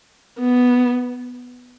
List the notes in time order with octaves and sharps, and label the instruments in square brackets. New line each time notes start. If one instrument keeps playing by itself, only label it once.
[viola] B3